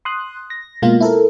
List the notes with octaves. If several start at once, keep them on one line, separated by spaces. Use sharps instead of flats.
C6 D#6 F#6
A#6
B2 G#3 A#3 F4 F5
E4 A4 A#4